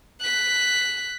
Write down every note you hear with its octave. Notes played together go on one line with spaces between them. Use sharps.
F#6 B6